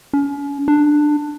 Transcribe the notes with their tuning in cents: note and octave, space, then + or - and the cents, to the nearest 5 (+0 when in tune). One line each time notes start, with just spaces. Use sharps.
C#4 +40
D4 +15